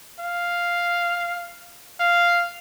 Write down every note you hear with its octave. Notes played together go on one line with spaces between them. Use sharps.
F5
F5